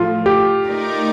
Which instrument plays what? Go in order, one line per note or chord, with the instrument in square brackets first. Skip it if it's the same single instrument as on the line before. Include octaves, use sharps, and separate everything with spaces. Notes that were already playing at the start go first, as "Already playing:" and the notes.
Already playing: [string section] A2 F3 A3 [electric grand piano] F4
[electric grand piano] G4
[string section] A3 D#4 A#4 D5